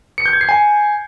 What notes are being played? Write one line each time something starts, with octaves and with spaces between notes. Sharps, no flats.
C#7
G6
G#6
C7
G#5